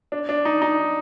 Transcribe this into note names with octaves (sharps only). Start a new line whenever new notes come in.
D4
D4
D#4
D#4